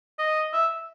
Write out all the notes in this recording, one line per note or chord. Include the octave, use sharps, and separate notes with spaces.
D#5
E5